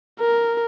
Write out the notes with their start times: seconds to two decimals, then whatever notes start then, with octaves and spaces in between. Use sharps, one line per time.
0.19 A#4